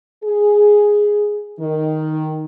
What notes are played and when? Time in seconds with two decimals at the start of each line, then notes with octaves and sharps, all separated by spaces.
0.24 G#4
1.60 D#3